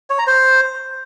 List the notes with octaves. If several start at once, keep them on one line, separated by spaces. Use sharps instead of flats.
C#5
A#5
C5